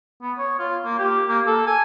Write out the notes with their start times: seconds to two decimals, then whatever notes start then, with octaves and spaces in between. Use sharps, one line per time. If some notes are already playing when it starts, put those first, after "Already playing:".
0.22 B3
0.38 C#5
0.59 F4
0.85 A#3
0.98 G4
1.29 A#3
1.47 A4
1.67 G#5